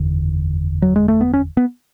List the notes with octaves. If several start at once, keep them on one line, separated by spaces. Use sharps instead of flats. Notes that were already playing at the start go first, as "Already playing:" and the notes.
Already playing: F#1 E2 D3
F#3
G#3
A3
B3
C#4
B3